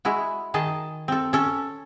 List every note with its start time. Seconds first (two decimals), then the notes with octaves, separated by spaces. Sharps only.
0.05 G#3 E4 F#4
0.54 D#3 G#4 D#5 A5
1.08 C4 A4
1.33 C#4 A4